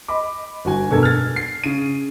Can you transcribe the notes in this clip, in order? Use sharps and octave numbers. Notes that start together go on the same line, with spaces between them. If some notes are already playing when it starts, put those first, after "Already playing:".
D#5 B5 D6
G1 F#4 G#5
F1 B2 D4 A4 A#4 G#6
F6 A6
C7
C#3 D#7